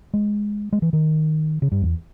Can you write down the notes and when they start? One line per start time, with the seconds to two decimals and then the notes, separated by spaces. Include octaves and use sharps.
0.14 G#3
0.73 G#3
0.82 E3
0.93 D#3
1.62 C#3
1.72 G2
1.82 E2